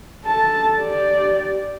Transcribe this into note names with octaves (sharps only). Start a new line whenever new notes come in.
A4 A5
G4 D5